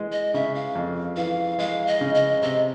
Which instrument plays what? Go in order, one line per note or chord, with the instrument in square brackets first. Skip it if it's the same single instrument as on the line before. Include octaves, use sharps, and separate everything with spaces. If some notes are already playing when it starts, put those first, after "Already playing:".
Already playing: [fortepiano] E3 G#3
[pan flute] D#5
[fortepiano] C#3 [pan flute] E5
[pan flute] F5
[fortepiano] F2
[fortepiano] E3 [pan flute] F5
[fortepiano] G#3 [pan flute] F5
[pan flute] D#5
[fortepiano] C#3
[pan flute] D#5
[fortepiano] C3 [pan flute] D#5